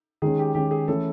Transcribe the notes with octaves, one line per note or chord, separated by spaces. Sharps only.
D#3 G#3 C#4 G#4
G4
D#3 G#3 C#4 G4
G#4
E3 A3 C#4 E4 A4